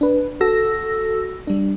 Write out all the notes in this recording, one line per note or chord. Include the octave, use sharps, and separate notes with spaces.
D4 B4
F#4 A4 E6 A#6
G3 D4